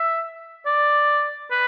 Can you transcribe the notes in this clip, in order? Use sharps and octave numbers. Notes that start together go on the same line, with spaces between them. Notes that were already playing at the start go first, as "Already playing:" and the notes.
Already playing: E5
D5
B4